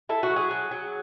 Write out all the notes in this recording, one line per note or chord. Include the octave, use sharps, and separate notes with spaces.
E4 A4
F#4
F#3
G#4
F#3
F#3